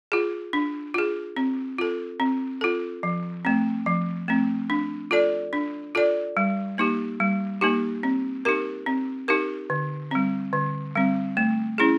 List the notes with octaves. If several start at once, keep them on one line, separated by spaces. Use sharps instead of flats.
F4 G#4
D4
F4 G#4
C4
F4 A4
C4
F4 A4
F3
A3 C4
F3
A3 C4
D4
F4 A4 D5
D4
F4 A4 D5
G3
A#3 D#4 G4
G3
A#3 D#4 G4
C4
D#4 G4 A#4
C4
D#4 G4 A#4
D3
G3 C4
D3
G3 C4
A3
C#4 E4 G#4